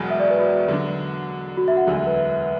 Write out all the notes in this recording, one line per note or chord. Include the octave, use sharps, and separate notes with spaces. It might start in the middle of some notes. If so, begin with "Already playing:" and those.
Already playing: E1 E2 B2 F#3
E5
D5
B4
F#4
D3 F#3 D4
F#4
E5
F#5
E1 D2 D3 F#3
E5
B4
E5